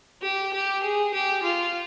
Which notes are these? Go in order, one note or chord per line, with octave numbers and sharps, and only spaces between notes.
G4
G4
G#4
G4
F4